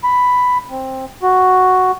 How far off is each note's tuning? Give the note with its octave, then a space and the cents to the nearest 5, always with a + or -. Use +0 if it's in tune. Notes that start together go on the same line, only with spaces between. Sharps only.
B5 +5
C4 +10
F#4 +0